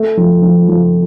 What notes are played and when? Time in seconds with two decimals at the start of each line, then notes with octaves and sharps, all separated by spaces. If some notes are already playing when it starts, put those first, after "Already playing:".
Already playing: A3
0.17 F3
0.42 F3
0.68 F3